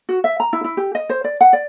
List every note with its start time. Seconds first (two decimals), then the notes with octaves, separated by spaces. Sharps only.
0.09 F#4
0.24 E5
0.40 A#5
0.53 E4
0.64 E4
0.77 G4
0.95 D#5
1.10 C5
1.24 D5
1.41 F#5
1.53 D5